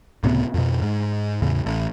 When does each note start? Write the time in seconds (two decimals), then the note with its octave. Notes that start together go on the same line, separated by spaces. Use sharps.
0.23 C#2 A2 C3 B3
0.54 F2 B2
0.82 G#2
1.42 E2 A2 C#3
1.66 A1